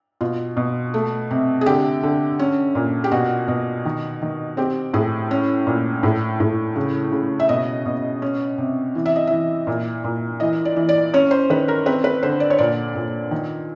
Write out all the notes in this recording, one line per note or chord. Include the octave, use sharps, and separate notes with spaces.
B2 F4
B2
A3
C3
G#4
D3 G4
D3
C#4
A#2
G4
B2 F#4
B2
D#3
D#3
C4 G4
A2 G#4
C#4
A#2
A2
A2
C#3
C#3
E5
B2 D#5
B2
C#4
C3
E3
E5
D#5
E3 E5
A#2
A#2
E3 D#5
D5
E3
D5
C#4 C#5
C5
D#3 B4
A#4
C4 B4
B4
D3 C5
D5
C#5
A#2 D5
A#2
D#3